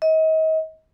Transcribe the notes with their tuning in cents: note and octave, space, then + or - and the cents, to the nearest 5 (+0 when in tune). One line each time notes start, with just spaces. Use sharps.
D#5 +35